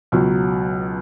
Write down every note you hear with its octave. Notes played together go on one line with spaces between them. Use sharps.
C#2 B2 F#3